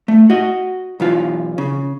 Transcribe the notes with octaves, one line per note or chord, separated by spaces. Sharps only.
A3
F#4 D#5
B1 E3 F4
C#3